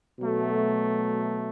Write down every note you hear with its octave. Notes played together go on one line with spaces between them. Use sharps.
B2 F#3 A3